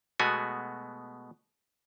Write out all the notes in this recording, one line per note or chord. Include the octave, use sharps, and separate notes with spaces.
B2 G#3 A3 B3 F#4 G#5